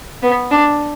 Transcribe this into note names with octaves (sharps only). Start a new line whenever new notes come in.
B3
D4